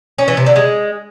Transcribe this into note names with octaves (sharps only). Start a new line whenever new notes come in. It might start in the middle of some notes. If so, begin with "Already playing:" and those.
C#4
E3
C3
D3
G#3